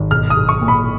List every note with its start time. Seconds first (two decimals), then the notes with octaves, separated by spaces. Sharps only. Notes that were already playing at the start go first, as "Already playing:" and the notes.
Already playing: G#1
0.11 B1 F6
0.30 D#6
0.36 B1
0.49 C#6
0.61 A#2
0.68 B5